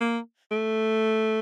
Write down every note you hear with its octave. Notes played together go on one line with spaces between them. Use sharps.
A#3
A3